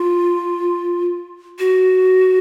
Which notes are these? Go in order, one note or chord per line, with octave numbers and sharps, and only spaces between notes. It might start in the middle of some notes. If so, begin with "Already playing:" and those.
Already playing: F4
F#4